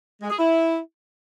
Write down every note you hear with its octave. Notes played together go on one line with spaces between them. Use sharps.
G#3
G#4
E4